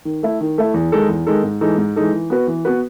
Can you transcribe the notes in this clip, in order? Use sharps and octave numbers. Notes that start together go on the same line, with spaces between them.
D#3
A3 E4
D#3
A3 E4
E2
D#3 G#3 D#4 A4
E2
D#3 G#3 D#4 A4
G#2
E3 G#3 D#4 A4
G#2
E3 G#3 D#4 A4
E3
B3 F#4 B4
E3
B3 F#4 B4